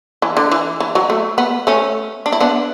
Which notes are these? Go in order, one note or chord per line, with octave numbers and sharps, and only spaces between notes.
E3
D3
E3
E3
F#3
A3
B3
A3 C#4
D4
E4
B3 D4